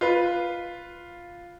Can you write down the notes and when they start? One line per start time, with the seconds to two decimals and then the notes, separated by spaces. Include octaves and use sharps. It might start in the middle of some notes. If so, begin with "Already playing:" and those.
0.01 F4 B4